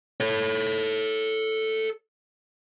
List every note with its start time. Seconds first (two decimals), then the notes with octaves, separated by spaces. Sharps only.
0.20 A4 C#5